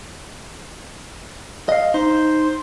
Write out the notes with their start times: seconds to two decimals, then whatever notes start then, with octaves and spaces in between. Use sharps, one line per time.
1.69 D#5 F5
1.94 D#4 C5